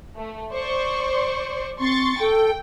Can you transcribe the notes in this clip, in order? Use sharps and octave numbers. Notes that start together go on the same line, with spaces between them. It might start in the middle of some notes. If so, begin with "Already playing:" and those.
A3
C5 D5 C#6
C4 C6 C#6 A6
A4 G5